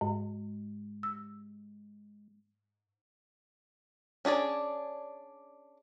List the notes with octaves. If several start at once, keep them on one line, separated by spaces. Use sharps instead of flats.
G#2 G#3
E6
C#4 D4 G#4 D5